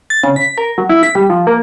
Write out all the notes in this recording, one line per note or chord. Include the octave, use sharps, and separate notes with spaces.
A6
C#3
B6
A#4
F#3
E4
B6
G3
F3
A#3